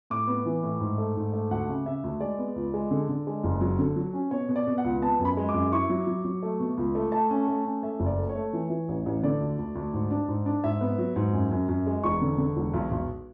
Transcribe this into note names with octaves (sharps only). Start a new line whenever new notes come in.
A2 D6
B3
E3
A2
G#2
A3
G#2
A3
D2 F#5
C#3
C#3 E5
D2
G#3 D5
B3
C#2
G#3
D3
D3
G#3
F#1
F#3
D3
F#3
C#4
B2 C#5
B2
D5
B2
F#5
C#2
B3 A5
F#2
B5
G#3
D6
F#2
E4 C#6
F#3
F#3
F#3
A3
B2
C#2
A3
A3 A5
C#4
A3
C#4
A3 E5
F#1
D5
A3
C#5
A3
E3
E3
A1
A1
D3 D5
D2
D2
D2
G#2
D4
G#2
D4
G#2 E5
B3
F#3
G#2
F#2
F#2
F#2
G#3
E1 C#6
D3
D3
E1
B1
B1